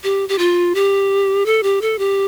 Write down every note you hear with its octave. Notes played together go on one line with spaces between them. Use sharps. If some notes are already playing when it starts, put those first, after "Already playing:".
G4
G4
F4
G4
A4
G4
A4
G4